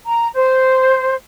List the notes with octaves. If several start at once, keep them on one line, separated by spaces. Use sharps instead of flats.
A#5
C5